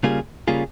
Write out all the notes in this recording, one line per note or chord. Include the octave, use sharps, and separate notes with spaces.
C#3 G3 A#3 F4 G#4
C#3 G3 A#3 F4 G#4